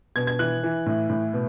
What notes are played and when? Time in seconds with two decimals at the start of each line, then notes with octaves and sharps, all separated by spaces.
0.16 B2 G#6
0.27 G#6
0.39 E3 F#6
0.63 E3
0.86 A2
1.09 A2
1.33 B2